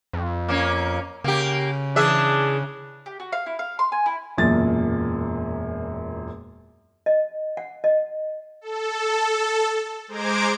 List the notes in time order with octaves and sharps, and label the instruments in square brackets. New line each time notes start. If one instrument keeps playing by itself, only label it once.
[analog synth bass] F2
[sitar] A#3 C#4
[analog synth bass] C#3 [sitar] A#3 G4
[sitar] E3 G#4 E5 [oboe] D4
[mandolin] G4
F#4
F5
E4
F5
C6
G#5
E4
[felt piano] E1 F#2 A#2 A#3 A6
[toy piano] D#5
F#5
D#5
[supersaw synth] A4
G#3 C5 A#5 D6 G#6 D7